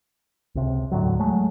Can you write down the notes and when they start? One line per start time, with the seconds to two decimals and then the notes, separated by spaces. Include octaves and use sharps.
0.55 C#2 C3
0.91 D#2 A2 D3 F#3
1.19 F#3 G#3 A3